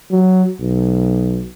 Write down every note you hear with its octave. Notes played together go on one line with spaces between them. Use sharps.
F#3
B1